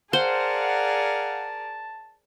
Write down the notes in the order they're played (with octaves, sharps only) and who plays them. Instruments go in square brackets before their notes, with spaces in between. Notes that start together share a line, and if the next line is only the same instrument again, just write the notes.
[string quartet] G#4 A#4 D5 [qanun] C5 [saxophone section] F5 F#5 [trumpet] A5